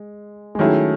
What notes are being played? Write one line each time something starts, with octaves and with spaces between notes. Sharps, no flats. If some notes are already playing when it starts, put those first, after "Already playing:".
Already playing: G#3
G#3
D#3 F#3 A3 C#4 E4 G#4